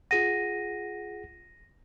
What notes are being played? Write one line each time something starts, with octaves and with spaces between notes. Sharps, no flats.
F4 G#4 F#5 A#6 D#7